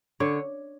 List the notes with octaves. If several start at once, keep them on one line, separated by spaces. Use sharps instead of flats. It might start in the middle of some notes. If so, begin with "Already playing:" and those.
D3 C#5